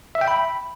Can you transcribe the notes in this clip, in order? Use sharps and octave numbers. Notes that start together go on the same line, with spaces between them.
E5
G5
B5